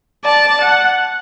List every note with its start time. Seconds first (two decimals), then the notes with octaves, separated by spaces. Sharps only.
0.25 D5 A5
0.62 F#5